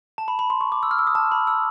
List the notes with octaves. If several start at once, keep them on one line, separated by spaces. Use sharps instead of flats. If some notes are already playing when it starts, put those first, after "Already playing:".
A5
B5
B5
C6
C#6
D6
E6
F6
E6
D#6
A5
B5
E6